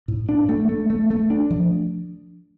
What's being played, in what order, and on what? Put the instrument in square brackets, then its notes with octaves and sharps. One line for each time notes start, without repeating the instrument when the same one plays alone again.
[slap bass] A2
D4
A3
A3
A3
A3
D4
F3